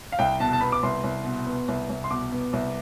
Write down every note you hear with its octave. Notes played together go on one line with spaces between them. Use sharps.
F5
C2 G5
B2 A5
A5
B3 B5
D6
C2 C6
C2
B2
B3
C2
C2
C6
B2 D6
B3
C2